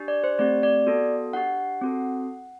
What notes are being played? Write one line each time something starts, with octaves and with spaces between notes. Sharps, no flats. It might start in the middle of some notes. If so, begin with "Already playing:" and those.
Already playing: D4 G4
D5
C5
A3 C4 G4 D5
D5
B3 F#4 A4
D4 G4 F#5
C4 F#4 A4